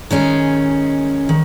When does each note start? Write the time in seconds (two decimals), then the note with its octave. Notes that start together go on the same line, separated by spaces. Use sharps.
0.11 D#3 G#3 C#4 G#4
1.29 D#3